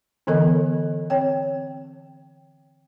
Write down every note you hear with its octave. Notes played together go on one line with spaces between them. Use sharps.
D3 E3 B3 A4 A#4 D#5
C4 C#5 G5